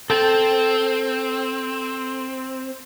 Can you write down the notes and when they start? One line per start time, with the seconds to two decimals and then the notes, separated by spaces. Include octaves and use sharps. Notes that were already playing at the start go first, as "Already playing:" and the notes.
0.10 C4 A4 G5 A5